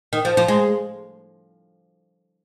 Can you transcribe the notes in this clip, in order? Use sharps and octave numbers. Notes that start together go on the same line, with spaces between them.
D#3
F3
F3
G#3